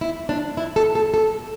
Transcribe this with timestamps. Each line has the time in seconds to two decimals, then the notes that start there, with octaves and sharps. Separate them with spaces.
0.01 E4
0.29 D4
0.57 E4
0.76 A4
0.95 A4
1.14 A4